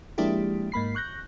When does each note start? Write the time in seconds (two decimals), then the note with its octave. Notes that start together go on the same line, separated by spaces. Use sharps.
0.18 F3 G#3 A#3 D4 E4 G4
0.72 G#2 A#3 B5 C7
0.95 C#6 F#6 G6 A#6